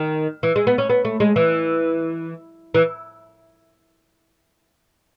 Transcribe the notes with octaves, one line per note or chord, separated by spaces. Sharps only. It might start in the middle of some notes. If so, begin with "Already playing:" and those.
Already playing: D#3
E3
G#3
B3
C#4
B3
A3
G#3
E3
E3